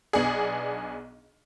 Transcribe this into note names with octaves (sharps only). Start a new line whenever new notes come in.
B1 B3 D4 G#4